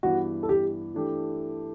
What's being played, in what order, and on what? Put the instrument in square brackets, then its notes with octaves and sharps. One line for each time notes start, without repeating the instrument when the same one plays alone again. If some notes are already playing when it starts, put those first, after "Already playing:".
[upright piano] G2 E3 B3 [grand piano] F#4
[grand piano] A4
G4
[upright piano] E3 A3 D4 G4